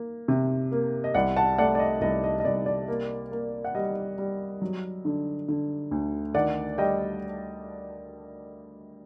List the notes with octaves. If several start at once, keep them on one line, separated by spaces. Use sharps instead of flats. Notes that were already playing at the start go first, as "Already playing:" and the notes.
Already playing: A#3
C3
A#3
D#5
C2 D5 F#5
F#5 A5
A3 D5 F#5
D5
D#5
C2 D#5
D#5
D#5
C2 D5
D5
A#3
A#3
F#5
G3 D#5
G3
F#3
D3
D3
D2
D#3 D5 F#5
G3 D#5 G5